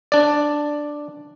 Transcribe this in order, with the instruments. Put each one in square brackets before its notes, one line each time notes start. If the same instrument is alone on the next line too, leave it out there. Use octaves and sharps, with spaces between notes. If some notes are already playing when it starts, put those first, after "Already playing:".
[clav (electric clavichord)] D4 D5